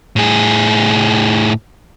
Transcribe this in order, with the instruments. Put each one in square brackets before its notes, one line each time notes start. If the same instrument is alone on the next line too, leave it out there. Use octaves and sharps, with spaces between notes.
[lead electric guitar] A2 G#4